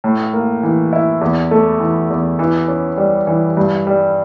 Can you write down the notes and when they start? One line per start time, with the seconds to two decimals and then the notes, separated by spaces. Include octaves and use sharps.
0.04 A2
0.33 A#3
0.63 E3
0.93 E4
1.21 E2
1.51 A3
1.80 E3
2.10 E2
2.39 E3
2.68 C#4
2.97 G3
3.27 E3
3.57 G2
3.87 G3